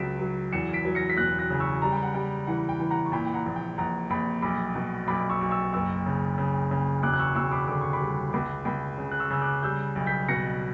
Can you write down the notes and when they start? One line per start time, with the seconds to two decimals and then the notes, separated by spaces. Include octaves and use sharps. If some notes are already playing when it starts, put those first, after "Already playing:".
Already playing: C#2 C#3 F#3 B6 D7 E7
0.19 F#3
0.52 E2 C#7 E7
0.73 B6 D7
0.85 F#3
0.95 A#6 C#7
1.09 B6
1.17 E1 F#6 A#6
1.39 F#6 A#6
1.50 C#3
1.60 C#6 E6
1.82 G3 A#5
1.92 G5
2.03 F#5
2.14 G3 G5
2.47 E3 F#5
2.69 G5
2.79 E3
2.91 F#5 A#5
3.06 C#6
3.12 A#2 G5 B5
3.27 G5
3.34 F#5 A#5
3.46 A#1
3.56 G5
3.78 A#1 F#5 A#5
4.10 A#1 G5 B5
4.42 B1 B5 D6
4.75 B2
5.08 B1 B5 D6
5.30 C#6 E6
5.41 B1
5.51 C#6 E6
5.73 F#1 C#6 E6
6.06 C#3
6.38 C#3
6.71 C#3
7.03 E1 D6 F#6
7.14 F#6
7.20 C#6 E6
7.35 E1 C#6 E6
7.51 B5 D6
7.68 D3 D6
7.81 C#6
7.93 B5 D6
8.00 G3
8.33 C#2 B5 D6
8.65 C#2 G5 B5
8.98 C#3
9.11 F#6
9.20 C#6 E6
9.30 C#3 E6
9.42 D6 F#6
9.63 G3 E6 G6
9.95 B1
10.06 G6 B6
10.28 B2 A#6 C#7